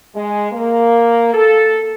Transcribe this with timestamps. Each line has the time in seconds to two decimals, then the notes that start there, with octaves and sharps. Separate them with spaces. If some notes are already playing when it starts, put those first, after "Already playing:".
0.15 G#3
0.52 A#3
1.34 A4